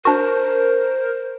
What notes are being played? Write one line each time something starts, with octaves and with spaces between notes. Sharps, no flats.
D4 F#4 A#4 C5